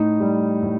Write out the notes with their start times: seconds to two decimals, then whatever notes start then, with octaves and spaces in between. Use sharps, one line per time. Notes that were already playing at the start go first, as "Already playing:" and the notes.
Already playing: A2 D#4
0.20 G3
0.62 A2